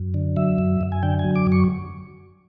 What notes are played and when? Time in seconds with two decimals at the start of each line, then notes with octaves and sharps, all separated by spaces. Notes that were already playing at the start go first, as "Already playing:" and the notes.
Already playing: F#2
0.14 D3
0.36 F#3 E5
0.58 F#2
0.81 F#2
0.92 G#5
1.03 D3 G5
1.19 G#5
1.24 F#3
1.36 D6
1.46 F#2
1.52 C#6